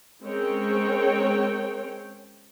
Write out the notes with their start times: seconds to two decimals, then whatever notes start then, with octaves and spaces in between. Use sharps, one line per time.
0.23 G#3 C4 C#4 A#4 C#5 G5